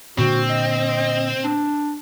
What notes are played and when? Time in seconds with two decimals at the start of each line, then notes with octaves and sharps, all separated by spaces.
0.18 A#2 D3 C4 F#4
0.50 D#5
1.44 D4